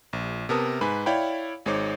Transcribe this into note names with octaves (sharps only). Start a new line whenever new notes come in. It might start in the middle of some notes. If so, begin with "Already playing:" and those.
A#1
C3 B3 A#4 A5 D#6
G#2 B4 G#5 B5
E4 C#5 D5 F5 G5 B5
G#1 G#3 D#4 C5 C#5 D6